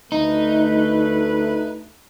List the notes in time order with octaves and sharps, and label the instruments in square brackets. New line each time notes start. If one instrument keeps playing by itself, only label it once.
[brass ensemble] D2 A3 B4 [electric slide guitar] D#4